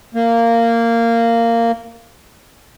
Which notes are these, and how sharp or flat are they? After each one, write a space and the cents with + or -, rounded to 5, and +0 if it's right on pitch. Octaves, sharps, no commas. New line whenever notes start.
A#3 -15